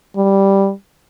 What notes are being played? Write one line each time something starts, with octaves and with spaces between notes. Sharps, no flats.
G3